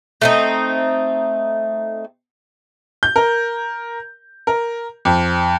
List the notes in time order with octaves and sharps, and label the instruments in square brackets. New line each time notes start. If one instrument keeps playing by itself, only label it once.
[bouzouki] A3 C4 D#4
[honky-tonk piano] G6
A#4
A#4
F2